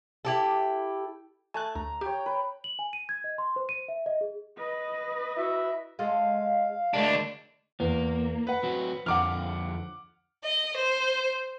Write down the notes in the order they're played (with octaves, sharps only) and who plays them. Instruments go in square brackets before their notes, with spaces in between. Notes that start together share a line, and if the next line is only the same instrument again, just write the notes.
[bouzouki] E4 G4 A4
[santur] A3 [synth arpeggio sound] G#5 A5 F#6
[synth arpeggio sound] D2 [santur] A#5
[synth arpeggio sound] G4 [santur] C#5 G5
[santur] B4
[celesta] F#7
G#5
D#7
G#6
D#5
C6
C5
D#7
E5
D#5
G#4
[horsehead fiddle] B4 D#5
[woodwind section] E4 F#4 E5
[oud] G#3 F4 A4 [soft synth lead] F5
[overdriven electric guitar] D2 D4 [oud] G#3 A#3 E4
[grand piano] E2 [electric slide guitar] A#3
[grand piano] B4 F#5
[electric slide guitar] F#3 C4 F#4
[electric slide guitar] F2 D3 F3 [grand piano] F#5 D6 F6
[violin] D#5
C5